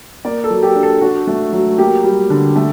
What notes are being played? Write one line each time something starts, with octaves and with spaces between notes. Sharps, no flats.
A#3 D5
A4
F#3
G4
D4
A4
D4 F#4
A3
F#3
A#3 G4
G3
D3
A3